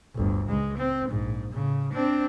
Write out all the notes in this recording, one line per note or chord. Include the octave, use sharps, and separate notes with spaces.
G1 D2
C#2 G#3
C4
A#1 G#2
A2 C#3
C4 D4